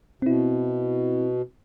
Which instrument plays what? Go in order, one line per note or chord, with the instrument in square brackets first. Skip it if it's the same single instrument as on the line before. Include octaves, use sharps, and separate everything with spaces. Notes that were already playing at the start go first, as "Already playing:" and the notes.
[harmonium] B2 [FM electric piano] C4 E4